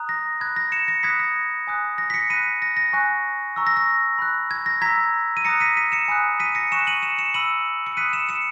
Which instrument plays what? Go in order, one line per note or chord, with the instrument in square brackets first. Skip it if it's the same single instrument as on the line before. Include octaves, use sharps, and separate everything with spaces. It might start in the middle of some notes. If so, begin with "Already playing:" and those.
Already playing: [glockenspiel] A#5 D#6 F#6
A#6
B5 F#6 G#6
A#6
C#7 E7
A#6 C#7
B5 D#6 F#6 G#6 B6
A#6
G#5 D#6 F#6
A#6
B6
A#6 C#7
B5 F#6 B6 D#7
A#6
A#6
G#5 C#6 F#6
A#5 C#6 E6
A#6
A#6
B5 F#6
G#6
A#6
A#5 E6 G#6 B6
D#7
A#5 D#6 F#6 A#6 C#7
B6 D#7
B6 D#7
C#7 E7
G#5 B5 D#6 F#6
B6 D#7
A#6 C#7
G#5 C#6 F#6 C#7 E7
D#7 F#7
C#7 E7
C#7 E7
B5 E6 D#7 F#7
C#7
B5 D#6 F#6 B6 D#7
C#7 E7
C#7 E7